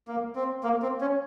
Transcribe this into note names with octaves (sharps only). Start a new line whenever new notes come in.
A#3
C4
A#3
C4
C#4